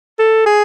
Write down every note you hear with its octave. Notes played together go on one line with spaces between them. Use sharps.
A4
G#4